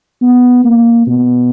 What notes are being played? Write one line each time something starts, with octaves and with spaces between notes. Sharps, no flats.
B3
A#3
B2